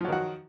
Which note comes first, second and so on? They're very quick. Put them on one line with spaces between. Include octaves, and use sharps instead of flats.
F3 F#3 D#3 F#4